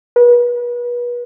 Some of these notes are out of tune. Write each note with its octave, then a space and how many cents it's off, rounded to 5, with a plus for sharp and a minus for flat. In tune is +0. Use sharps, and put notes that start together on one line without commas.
B4 -35